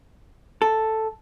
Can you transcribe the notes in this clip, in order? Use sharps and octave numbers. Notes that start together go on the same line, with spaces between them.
A4